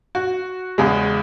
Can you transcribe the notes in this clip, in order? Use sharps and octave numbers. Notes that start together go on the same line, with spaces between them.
F#4
E2 C#3 G#3